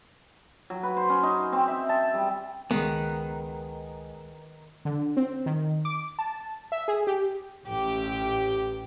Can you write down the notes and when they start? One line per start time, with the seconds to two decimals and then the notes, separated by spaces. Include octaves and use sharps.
0.70 F#3
0.83 B4
0.97 C5
1.09 C#4
1.23 D#4
1.52 C4
1.68 E5
1.89 A5
2.14 G3
2.71 C#2 D#3 G#3 B3
4.85 D3
5.17 C4
5.46 D#3
5.85 D6
6.19 A5
6.72 E5
6.88 G#4
7.07 G4
7.65 A1 G4